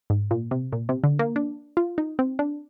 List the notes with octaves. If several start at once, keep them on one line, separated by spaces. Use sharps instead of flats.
G#2
A#2
C3
A#2
C3
D3
A#3
D4
F4
D#4
C4
D4